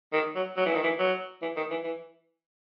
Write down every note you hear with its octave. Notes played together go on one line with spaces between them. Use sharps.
D#3
F#3
F#3
E3
D#3
E3
F#3
E3
D#3
E3
E3